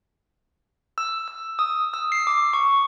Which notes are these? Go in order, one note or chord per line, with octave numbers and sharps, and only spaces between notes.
E6
E6
D#6
E6
C7
D6
C#6